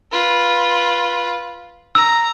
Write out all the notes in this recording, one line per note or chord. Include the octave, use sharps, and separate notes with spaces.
F4 B4
A#5 E6